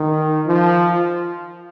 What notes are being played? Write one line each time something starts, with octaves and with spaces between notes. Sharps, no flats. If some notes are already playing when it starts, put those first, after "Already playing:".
Already playing: D#3
F3